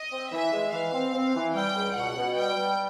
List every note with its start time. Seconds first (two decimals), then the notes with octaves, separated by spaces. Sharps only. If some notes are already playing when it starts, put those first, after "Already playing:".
Already playing: D#5
0.11 C4
0.32 E3 E5
0.52 G#3
0.72 E3 F5
0.93 C4
1.14 C4
1.35 E3
1.54 G3 G5
1.75 C#2
1.96 B2 F#5
2.16 B2
2.37 G3 G5
2.58 G3